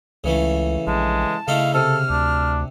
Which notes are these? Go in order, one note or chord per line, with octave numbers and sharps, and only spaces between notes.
C#2 C#3 E3 A3
A#1 G#3 A5
C#3 A3 D#4 E4 F5
C3 A4 F6
D2 D4